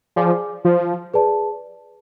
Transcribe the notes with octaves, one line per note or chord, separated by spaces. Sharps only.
F3 G#4 D5 G#5 D6
F3
G#4 B4 D5 A5